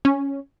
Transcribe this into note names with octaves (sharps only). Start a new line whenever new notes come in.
C#4